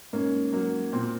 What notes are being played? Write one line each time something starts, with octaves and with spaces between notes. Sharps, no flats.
G#2 A#3 C#4
F#3 A#3
A#2 C4